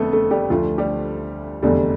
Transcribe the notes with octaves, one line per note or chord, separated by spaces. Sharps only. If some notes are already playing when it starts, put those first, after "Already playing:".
Already playing: F1 F2 D3 A3 B3 A4
A3 A4
G3 G4
D2 D3 F3 A3 F4
G3 G4
F1 E2 D3 G3